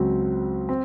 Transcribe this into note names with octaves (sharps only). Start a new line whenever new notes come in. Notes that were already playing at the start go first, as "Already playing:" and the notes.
Already playing: C#2 C#3 F#3 C4 F#4
C4